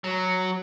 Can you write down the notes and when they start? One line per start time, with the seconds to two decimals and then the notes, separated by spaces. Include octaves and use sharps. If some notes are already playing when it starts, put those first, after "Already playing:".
0.04 F#3